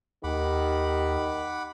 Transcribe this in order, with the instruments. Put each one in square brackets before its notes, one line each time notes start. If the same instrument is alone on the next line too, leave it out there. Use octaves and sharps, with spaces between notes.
[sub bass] D#2 [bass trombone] D#3 [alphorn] G4 [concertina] F#5 B5 D6